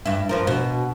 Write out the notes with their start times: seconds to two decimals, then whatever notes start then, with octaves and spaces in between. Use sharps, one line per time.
0.06 G2 E4
0.29 G2 F3 A#4
0.47 B2